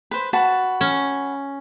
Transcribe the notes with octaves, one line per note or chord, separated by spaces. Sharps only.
B4 C5
F#4 B4 A5
C#4